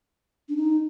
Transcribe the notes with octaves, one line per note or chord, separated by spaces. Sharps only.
D4
D#4